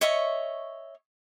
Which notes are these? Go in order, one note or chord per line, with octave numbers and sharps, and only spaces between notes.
C#5 D#5 E5 C#6